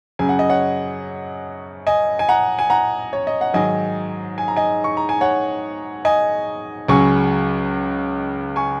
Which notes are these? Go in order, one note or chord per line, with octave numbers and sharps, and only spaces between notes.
F#2 C#3 F#3 G#5
F#5
D#5
C#5 F#5
D#5 G#5
G#5
F#5 A#5
G#5
F#5 A#5
C#5
D#5
F#5
G#2 D#3 F#3 D#5 G#5
G#5
A#5
D#5 G#5
C#6
A#5
G#5
C#5 F#5
D#5 G#5
C#2 C#3 F#3 G#5 C#6
G#5 C#6